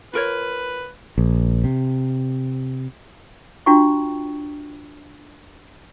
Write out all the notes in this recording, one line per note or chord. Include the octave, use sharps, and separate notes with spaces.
F4 A#4 B4 C#5
A#1
C3
D4 F4 F#4 G5 A#5 C#6